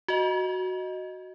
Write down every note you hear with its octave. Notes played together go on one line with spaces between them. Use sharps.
F#4 D#5